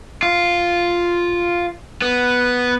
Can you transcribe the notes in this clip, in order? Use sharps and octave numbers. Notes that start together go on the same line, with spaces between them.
F4
B3